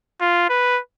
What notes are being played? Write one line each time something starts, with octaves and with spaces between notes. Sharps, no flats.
F4
B4